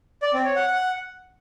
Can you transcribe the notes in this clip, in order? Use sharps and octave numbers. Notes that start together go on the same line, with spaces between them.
D5
C4
C#5
F#5
F#5